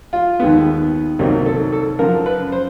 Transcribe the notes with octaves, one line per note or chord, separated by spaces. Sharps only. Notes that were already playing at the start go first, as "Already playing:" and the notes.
F4
D#2 D#3 G#3 B3
C2 C3 D#3 F#3 A#3 D#4
A4
A4
F#2 C#3 F3 A#4
B4
C5